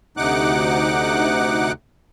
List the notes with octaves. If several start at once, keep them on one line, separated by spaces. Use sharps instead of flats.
D2 C3 D#4 F#5 D6 F#6